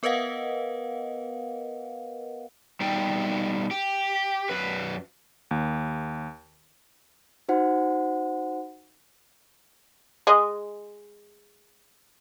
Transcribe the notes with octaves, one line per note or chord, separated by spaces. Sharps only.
B3 A#4 B4 D#5 F5 F#5
B2 G3 D#4 G5
G4
F#2 B4
D#2
D#4 F#4 C5 F#5
G#3 G#4 D#5